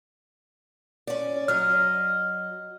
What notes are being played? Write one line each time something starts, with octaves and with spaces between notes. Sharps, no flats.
C#4 D5
F#3 D#5 F6